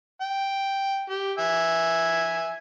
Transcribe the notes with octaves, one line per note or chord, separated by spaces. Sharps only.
G5
G4
E5 G#5